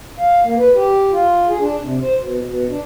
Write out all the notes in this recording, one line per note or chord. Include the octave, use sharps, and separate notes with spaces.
F5
A#3
B4
G4
F4
G#4
D4
C3
C5
B2
B2
D4